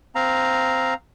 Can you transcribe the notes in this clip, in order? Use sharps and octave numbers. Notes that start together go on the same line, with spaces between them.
C4 F5 A#5